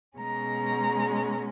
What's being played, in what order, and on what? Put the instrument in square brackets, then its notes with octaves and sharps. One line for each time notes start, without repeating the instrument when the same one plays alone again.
[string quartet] B2 G#3 C#4 A#5